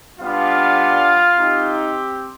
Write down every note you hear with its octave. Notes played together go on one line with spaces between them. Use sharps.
G3 B3 D4 F4 F5
C4 D#4 G4